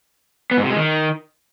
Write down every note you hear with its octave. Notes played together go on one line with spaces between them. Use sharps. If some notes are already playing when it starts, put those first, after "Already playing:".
B3
G#2
C3
G#3
D#3